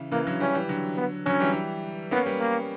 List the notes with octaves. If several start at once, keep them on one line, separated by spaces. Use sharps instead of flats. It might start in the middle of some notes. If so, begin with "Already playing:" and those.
Already playing: C#3 E3
C#3 E3 A#3
D3 F#3
E3 G3 C#4
E3 G3
D3 F#3
B3
D3 F#3 C#4
E3 G3
A#3 B3 C#4
G3 B3
A#3